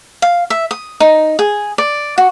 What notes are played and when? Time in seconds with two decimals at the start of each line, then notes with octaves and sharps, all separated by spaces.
0.22 F5
0.50 E5
0.71 D#6
1.00 D#4
1.39 G#4
1.78 D5
2.18 F#4